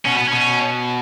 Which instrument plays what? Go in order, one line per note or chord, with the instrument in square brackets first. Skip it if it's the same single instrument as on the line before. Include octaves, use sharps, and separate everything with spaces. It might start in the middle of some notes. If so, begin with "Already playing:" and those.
[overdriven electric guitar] B2 [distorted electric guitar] C#4
[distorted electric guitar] B3
[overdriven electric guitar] B2 [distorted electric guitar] C#4